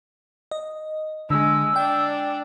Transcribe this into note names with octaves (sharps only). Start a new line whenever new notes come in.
D#5
D3 G#3 E6
D4 G5